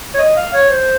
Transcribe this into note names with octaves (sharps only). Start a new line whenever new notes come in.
C#5
D#5
F5
C#5
C5